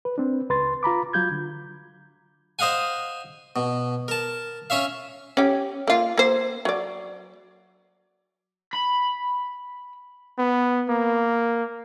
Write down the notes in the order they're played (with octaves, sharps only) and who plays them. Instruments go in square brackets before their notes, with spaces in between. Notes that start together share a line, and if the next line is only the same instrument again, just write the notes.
[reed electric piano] B4
C4 D4
C#2 B4 C6 A6
F4 A#5 B5 D6
F#3 F4 G6 G#6
D3
[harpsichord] C5 D#5 F5 F#5 G#5
B2
A#4 A5
C#4 C#5 E5 F5
[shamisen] C#4 G4
A#3 F4
A#3 C5
F#3 D5
[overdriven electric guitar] B5
[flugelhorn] B3
A#3